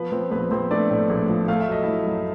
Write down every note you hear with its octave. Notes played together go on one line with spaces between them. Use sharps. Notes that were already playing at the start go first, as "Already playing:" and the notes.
Already playing: F3 B3 B4
F3 C4 C5
A#1 B3 B4
A#1 C4 C5
A3 D4 D5
A2
A#1
F3
A3 F5
E5
F#3 D#5
F#3 E4 E5
F#2